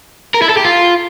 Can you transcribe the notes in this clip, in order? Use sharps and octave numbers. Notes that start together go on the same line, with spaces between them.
A#4
E4
A4
G4
F4